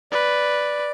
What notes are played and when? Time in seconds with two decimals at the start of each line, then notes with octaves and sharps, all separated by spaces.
0.12 B4 D5